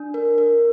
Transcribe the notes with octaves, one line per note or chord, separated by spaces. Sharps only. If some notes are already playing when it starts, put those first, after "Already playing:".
Already playing: D4
A#4
A#4